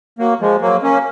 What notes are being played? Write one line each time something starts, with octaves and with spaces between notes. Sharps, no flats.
F#3 A#3
F3 G#3
F#3 A#3
A#3 C#4